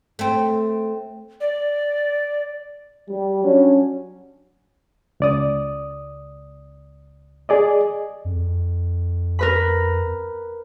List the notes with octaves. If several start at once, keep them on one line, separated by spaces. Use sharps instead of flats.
A3 C4
D5
G3
F#3 C#4 D4
C#2 D5 D#6
G#4 D5 D#5
F2
A#4 B4 B5